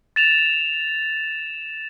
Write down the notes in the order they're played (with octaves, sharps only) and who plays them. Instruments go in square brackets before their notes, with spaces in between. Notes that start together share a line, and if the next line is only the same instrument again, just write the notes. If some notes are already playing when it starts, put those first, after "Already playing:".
[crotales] A6 E7 F7